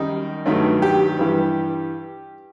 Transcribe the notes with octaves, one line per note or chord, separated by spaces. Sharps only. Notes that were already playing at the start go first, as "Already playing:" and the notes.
Already playing: F#2 D#3 G3 D#4
G2 D#3 F#3 A3
G4
G2 E3 G3